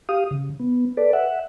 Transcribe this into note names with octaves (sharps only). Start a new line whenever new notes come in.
G4 F5 D#6
C#3
B3
A4 B4 D5
E5 F#5